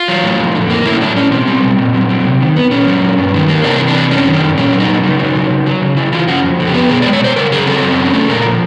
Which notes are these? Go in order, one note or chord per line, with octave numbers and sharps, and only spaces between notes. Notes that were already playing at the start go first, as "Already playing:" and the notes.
Already playing: F4
F#3
A2
F2
D3
A#3
A2 E4
C#4
F#3 D4
A2 C#4
B2 C4
G3
B2
A#2
F#3
C4
C3
D#3
B3
A#2 C#4
F#3
A#2
G2
D#3
A#3
C3 D4
E3
D4
C3
F#2 C#4
D#3
D4
F#2
A#2 C#4
F#3
D#4
A#2
C#3 D#4
F#3
C#3
C#3
F#3
C#3
C#3 E4
E3 F4
C#3 F#4
F2
D3
G4
B3
B2 G#4
G#3 D5
C#5
B2 C5
C#3 A#4
F#3 G#4
C4 A4
F#2
C#3
A3
A#2 A#4
F3